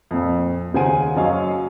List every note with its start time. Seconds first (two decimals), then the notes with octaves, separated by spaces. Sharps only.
0.11 F2 A#2
0.74 D#2 C#3 C5 F#5 G#5 D#7
1.16 F#2 F#3 D#5 F5 C#6